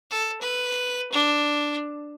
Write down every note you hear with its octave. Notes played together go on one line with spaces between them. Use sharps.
A4
B4
D4